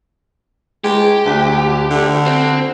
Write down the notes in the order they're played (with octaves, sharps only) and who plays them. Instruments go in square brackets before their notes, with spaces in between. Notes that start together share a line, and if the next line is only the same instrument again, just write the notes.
[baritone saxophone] G#3 [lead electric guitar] G4
[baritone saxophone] D2
D3
[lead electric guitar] C4